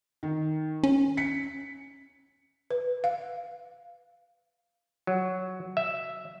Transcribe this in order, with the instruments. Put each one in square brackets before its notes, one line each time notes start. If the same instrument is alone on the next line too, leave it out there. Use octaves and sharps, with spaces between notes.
[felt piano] D#3
[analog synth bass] C#4
[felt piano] B6 C#7
[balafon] B4
F5
[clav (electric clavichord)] F#3
E5